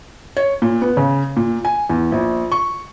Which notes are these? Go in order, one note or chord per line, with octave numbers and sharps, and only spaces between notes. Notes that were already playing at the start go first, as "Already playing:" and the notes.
C#5
A#2
B3
C#3
A#2
G#5
E2
A#1
C#6